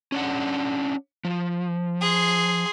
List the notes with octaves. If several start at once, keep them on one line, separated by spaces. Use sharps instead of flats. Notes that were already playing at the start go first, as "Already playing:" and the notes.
C#4 D4 F#5
F3
G#4 C6